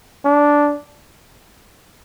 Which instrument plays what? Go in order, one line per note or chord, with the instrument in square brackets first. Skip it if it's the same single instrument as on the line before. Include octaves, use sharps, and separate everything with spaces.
[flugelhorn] D4